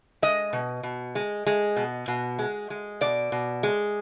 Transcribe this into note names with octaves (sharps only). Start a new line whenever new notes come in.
G#3 D#5
B2
B2
G#3
G#3
B2
B2
G#3
G#3
B2 D5
B2
G#3